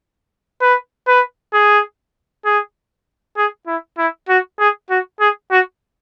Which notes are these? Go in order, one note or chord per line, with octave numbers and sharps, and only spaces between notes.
B4
B4
G#4
G#4
G#4
E4
E4
F#4
G#4
F#4
G#4
F#4